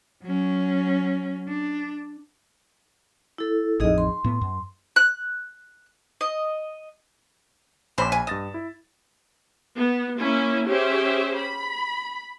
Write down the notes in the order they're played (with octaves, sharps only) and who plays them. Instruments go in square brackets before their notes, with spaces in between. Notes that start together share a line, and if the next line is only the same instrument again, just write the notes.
[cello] F#3 C#4
D4
[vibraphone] E4 A4
[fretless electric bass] A1 F2 [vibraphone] D#4 G#4 D#5
[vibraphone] C6
[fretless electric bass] A2 B3
F#2
[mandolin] F#6
D#5
[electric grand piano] A#1 B5 D6 [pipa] C4 C#4 C5
[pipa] G#5
[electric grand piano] G2 A6 E7 [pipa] D#5
[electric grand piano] E4
[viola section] B3
A#3 C#4 E4
C#4 G4 G#4 C5 E5
B5